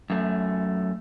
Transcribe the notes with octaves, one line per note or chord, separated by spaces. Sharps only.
F#2 A3